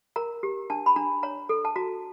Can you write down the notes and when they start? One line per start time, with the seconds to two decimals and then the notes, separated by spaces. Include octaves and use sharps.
0.16 A#4 A#5
0.43 G4
0.70 D4 A5
0.86 B5
0.96 D4 A#5
1.23 C#5 A#5
1.49 A4
1.65 A5
1.76 F#4 A#5